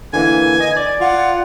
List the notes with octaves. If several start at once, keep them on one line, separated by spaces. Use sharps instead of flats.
D3 E3 A#3 G#5
D#5
D5
F4 F#5